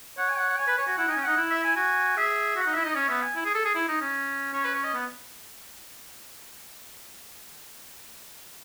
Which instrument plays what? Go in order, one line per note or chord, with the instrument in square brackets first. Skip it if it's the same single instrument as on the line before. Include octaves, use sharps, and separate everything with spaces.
[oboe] C#5 [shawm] F#5
[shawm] G#5
F#5
F#5
[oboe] C#5 [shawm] G#5
[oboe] B4
[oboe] C#5 [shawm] G#5
[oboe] F#4
[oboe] E4 [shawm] F#5
[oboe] D#4 [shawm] G#5
[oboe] C#4
[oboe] D#4 [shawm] F#5
[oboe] E4
[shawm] E5
G#5
[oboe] F#4 [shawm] G#5
[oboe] G#4 [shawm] E5
[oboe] F#4
[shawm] F#5
[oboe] D#4
[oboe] E4 [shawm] E5
[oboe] D#4 [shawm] D#5
[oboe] C#4 [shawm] C#5
[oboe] B3 [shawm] E5
[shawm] G#5
[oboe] E4
G#4
A4
G#4
E4
D#4
C#4
[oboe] C#4 [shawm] C#5
[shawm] B4
C#5
D#5
[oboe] B3